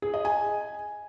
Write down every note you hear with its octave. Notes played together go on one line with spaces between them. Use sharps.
G#4
D#5
G#5